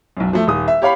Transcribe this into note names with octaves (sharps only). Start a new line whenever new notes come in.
B1 F#2
F3 A3
D#1 D#6
E5
G4 C#5 F5 B5